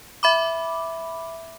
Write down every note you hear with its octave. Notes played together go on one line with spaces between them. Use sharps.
E5 B5 D6